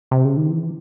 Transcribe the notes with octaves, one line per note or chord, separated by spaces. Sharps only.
C3
C#3
D#3
E3